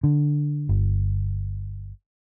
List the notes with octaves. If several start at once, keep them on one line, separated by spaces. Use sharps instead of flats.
D3
G1